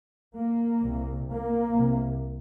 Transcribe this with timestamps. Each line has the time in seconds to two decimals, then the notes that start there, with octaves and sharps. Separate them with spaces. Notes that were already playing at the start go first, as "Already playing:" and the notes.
0.36 A#3
0.83 C2 C3
1.29 A#3
1.76 C2 C3